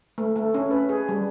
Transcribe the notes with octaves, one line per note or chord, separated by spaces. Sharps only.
A3
A3
C#4
B4
G#4
G3